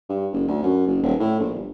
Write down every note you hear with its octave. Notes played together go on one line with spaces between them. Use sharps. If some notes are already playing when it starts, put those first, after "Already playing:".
G2
F#1
D2
F#2
F#1
D#1
A2
A#1
G1